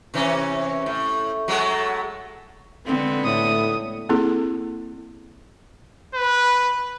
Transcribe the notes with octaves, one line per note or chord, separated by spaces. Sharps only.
C3 E3 C#4
A2
F#3 G#3 A3
D3 G#3 B3 C4
A2 D#6
A#3 C4 E4 G#4 A4
B4